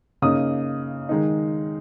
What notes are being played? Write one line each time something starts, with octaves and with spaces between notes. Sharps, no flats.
C#3 A#3 D#4 D#6
D#3 G#3 D#4